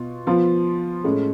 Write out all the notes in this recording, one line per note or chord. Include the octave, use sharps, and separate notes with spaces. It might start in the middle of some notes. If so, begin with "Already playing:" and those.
Already playing: B2 F4
F3 B3 F4
A2 G#3 C#4